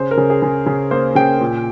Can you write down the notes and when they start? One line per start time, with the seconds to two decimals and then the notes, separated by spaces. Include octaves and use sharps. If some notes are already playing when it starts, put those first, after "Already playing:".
Already playing: C#3 C5
0.11 A#4
0.17 C#3
0.30 G#4
0.42 C#3
0.66 C#3
0.91 A#3 C5
1.15 C#3 G5
1.41 A#2